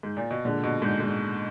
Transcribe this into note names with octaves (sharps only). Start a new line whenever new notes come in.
G#2
A#2
B2
A#2 D3 G#3 D4
B2
G#2
G#2